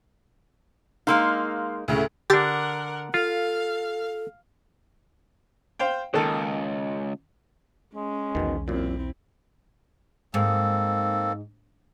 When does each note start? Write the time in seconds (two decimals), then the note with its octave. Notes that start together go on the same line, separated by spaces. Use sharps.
1.07 G#3 A#3 D#4 F5 C6 E6
1.88 D2 A2 C#3
2.30 D3 D4 G4 A#4 F#5 A6
3.14 F4 A4 F5
5.79 C5 F5 G5
6.14 C#2 F#2 D#3 A#3 A4
7.95 G#3 C#4
8.35 B1 E2 B2 D#3
8.68 F#2 A#2 C4 E4
10.34 G#2 A#3 C4 A4